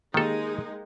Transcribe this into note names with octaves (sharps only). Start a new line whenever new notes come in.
D#3 G#3 A#3 D#4 G4 A4